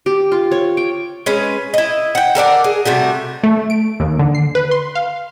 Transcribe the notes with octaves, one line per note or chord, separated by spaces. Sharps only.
G4
F4
C#5
G5
G#3 C#4 B4
E4 D#5
F#5 G5
A4 A#4 D5 F#5
G#4
C3 G3 A3 F#4
A3
D7
D#2
D3
C7
B4
C6
F5